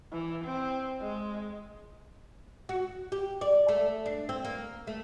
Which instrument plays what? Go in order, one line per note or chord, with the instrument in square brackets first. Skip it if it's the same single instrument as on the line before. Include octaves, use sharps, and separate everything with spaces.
[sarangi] E3
C4
G#3
[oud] F#4
G4
D5
A3
D4
C4
A#3
A3